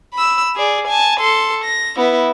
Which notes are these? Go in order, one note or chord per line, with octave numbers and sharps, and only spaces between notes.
B5 E6
G#4 D5
G#5 A5
A4 C6
A#6
B3 E4